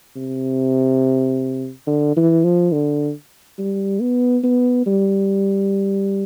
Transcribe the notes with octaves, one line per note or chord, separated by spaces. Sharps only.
C3
D3
E3
F3
D3
G3
B3
B3
G3